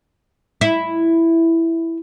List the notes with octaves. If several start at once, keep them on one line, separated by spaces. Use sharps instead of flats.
E4